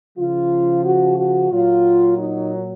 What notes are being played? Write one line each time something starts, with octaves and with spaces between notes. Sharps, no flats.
C#3 F3 F4
F#4
F#4
A#2 F#3 F4
D#4